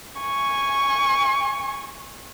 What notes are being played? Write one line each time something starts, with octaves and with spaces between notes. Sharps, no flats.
G#5 C#6